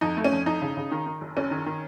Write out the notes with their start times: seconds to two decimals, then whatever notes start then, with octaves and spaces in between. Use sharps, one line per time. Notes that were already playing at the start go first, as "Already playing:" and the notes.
0.01 F2 D#4
0.17 A3
0.24 C#4
0.32 F2
0.46 F2 D#4
0.62 C#3
0.77 C#3
0.92 D#3
1.06 D#3
1.21 F#1
1.36 F#1 C#4
1.51 D#3
1.66 D#3